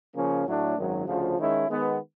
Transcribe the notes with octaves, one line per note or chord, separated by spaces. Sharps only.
C#3 F3 A#3 C#4
A2 F#3 A3 D4
G#1 F#2 D#3 F#3
D2 C#3 F3
D#3 G#3 C#4 E4
D#3 G#3 B3